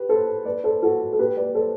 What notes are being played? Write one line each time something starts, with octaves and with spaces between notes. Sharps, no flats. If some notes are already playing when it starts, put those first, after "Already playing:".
Already playing: G4 B4
A4 C5
B4 D5
A4 C5
F#4 A4
A4
G4 B4
B4 D5
A4 C5